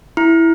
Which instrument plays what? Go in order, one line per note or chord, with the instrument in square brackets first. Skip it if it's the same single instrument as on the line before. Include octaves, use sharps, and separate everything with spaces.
[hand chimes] E4